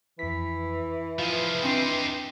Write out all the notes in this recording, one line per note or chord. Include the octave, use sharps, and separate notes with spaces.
F2 E3 B6
F3 F4 G#4
C4 D4 D#4 G4 G5 G#5 C6 C7